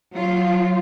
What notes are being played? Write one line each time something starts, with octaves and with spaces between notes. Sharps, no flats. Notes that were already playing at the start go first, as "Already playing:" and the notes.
F#3 F4